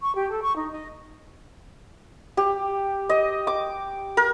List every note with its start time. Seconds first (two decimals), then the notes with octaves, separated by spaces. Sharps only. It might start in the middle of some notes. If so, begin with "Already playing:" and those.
0.01 C#6
0.15 G4
0.30 A4
0.43 C#6
0.56 D#4
0.72 D#5
2.37 G4
3.09 D#5
3.47 D6
4.17 A#4